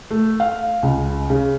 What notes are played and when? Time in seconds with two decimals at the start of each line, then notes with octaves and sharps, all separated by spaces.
0.11 A3
0.40 F5
0.83 C#2
1.30 C#3